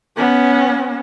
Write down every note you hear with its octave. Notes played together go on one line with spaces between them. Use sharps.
B3 C#4